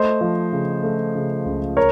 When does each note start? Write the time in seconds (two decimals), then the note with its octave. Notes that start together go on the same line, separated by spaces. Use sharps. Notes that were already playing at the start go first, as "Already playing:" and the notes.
Already playing: A3 C5 D#5
0.21 F3
0.53 C#3
0.83 A3
1.15 C#3
1.46 C#2
1.77 A#4 C#5